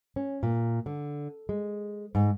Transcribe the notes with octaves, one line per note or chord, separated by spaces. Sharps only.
C#4
A#2
D3
G#3
G#2